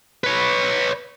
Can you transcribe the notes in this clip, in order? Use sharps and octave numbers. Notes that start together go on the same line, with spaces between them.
B4 C#5